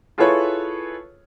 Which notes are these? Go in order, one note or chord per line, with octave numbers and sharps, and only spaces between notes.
E4 F4 G#4 A4 B4 C#5